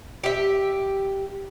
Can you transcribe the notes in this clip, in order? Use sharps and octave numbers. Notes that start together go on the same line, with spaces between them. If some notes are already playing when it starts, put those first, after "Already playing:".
G4 E5